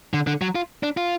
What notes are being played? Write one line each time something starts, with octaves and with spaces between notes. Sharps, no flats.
D3
D3
F#3
F4
D4
F4